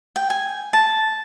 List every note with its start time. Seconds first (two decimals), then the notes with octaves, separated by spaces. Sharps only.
0.16 G5
0.30 G#5
0.73 A5